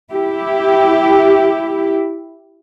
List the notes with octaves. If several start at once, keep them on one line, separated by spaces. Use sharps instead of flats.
E4 G4